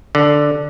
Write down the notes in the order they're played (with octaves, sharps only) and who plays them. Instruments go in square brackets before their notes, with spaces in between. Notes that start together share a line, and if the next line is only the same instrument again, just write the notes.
[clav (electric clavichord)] D3